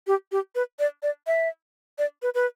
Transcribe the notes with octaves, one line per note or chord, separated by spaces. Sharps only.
G4
G4
B4
D5
D5
E5
D5
B4
B4